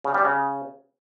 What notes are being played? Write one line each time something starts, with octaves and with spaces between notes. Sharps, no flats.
C#3
G3
C#3